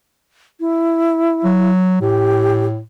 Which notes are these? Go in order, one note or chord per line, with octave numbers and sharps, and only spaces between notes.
E4
F#3
A2 G4